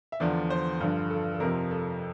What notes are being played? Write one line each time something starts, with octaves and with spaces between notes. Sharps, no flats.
E5
E2 D3 F3 D5
C5
G2 D3 F3
A4
A4
F2 C3 F3 A#4
A4